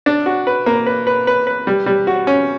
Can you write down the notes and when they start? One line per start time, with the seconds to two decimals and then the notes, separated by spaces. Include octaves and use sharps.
0.06 D4
0.26 F#4
0.47 B4
0.66 A#3
0.87 B4
1.07 B4
1.27 B4
1.47 B4
1.67 G3
1.86 G3
2.07 F#4
2.27 C#4